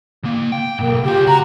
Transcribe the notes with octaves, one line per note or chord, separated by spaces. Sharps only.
C#3 A#3
G5
B1 G#2 A#3
C#3 F4 G4
F#4 A#5